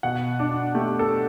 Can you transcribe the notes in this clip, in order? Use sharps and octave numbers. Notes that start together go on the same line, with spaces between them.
B2 F#5
D4
A3 G4
A4